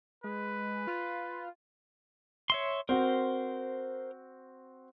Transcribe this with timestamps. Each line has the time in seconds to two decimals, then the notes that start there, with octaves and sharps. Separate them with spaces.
0.24 G#3 B4
0.87 F4
2.50 C#5 E5 C6
2.89 C4 F#4 A#4 C5